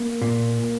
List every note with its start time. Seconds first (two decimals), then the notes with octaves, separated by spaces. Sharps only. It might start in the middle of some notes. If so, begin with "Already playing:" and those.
Already playing: A#3
0.22 A#2